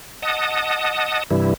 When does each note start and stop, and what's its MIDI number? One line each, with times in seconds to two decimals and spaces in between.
0.22 1.23 75
0.22 1.23 78
0.22 1.23 81
0.22 1.23 87
1.31 1.54 43
1.31 1.54 48
1.31 1.54 52
1.31 1.54 55
1.31 1.54 64